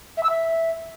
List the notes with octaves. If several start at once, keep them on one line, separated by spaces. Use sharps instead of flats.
E5
E6
E5